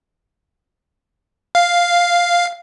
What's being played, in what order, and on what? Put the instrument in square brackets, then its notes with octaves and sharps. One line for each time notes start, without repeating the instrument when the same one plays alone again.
[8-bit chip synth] F5